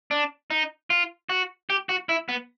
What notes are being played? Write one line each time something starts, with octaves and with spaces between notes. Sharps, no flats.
D4
D#4
F4
F#4
G4
F#4
E4
B3